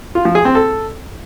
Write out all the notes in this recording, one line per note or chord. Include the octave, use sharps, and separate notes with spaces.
F4
F3
G#4
C4
A4